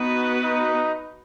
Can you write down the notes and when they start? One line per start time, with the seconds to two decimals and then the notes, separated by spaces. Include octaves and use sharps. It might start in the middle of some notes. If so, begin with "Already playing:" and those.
Already playing: B3 D#4 F#4 B4
0.43 D#4